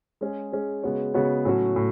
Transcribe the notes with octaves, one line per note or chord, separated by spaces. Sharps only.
G#3 C#4 G#4
G#3 C#4 G#4
C#3 G#3 B3 F#4 C#5
C#3 G#3 B3 F#4 C#5
A2 F#3 C#4 F#4
A2